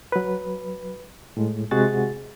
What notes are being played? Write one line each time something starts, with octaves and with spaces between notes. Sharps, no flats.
F#3 B4
A2 G#3
C3 G#3 F#4 G#4 F#5 A6